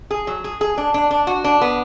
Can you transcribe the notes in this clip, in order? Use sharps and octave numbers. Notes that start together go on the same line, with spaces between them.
G#4
F#3
G#4
G#4
D4
D4
D4
F#4
D4
B3